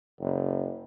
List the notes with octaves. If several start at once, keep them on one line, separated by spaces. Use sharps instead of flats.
F#1